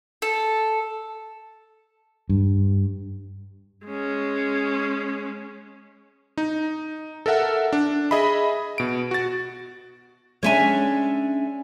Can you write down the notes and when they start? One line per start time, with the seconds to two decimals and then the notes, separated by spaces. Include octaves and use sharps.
0.22 A4
2.29 G2
3.87 G#3 C#4
6.37 D#4
7.26 A4 A#4 E5 F#5
7.73 D4
8.11 G#4 D#5 E5 B5
8.78 B2 D7
9.11 F#4 A6
10.43 G#3 C#4 D4 C#5 E5 G#5